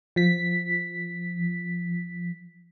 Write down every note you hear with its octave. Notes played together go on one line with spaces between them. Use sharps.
F3 B6